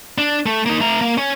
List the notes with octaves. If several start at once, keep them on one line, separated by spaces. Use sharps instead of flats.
D4
A3
A#3 D#4
A3 A#5
A#3
C#4